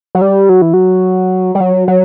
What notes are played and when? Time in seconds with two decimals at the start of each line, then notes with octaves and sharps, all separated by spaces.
0.15 F#3
0.22 G3
0.49 F#3
0.62 E3
0.74 F#3
1.55 G3
1.60 F#3
1.88 F#3